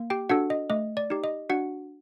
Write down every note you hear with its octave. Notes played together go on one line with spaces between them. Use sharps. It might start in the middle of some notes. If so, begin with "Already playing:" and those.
Already playing: A#3
G4 G5
D4 F#4 A4 F#5
D#5
A3 D#5
D5
D#4 G4
D#5
D4 F#4 F#5